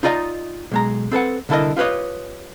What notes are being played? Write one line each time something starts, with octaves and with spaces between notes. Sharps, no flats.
D#4 F4 D5 D#5 F#5 A#5
B1 G#3 A#5
C4 A4 B4 F#5
C2 D3 E4 A4 A#4 D#5
F4 G4 B4 C#5 D#5